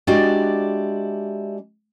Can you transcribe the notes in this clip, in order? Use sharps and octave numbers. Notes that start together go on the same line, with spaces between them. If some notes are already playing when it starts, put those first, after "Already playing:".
G#3 D4 E4 F#4 G4 D5